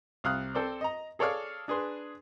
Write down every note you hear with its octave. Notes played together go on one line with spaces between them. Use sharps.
C2 F5 D#6 F6 F#6
C4 A4 C5 D5
D#5 A#5
G#4 A4 C#5 D5 F5 F6
D4 G#4 B4 C6